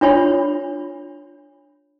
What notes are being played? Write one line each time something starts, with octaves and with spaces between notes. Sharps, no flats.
D4 F4 C#5 B5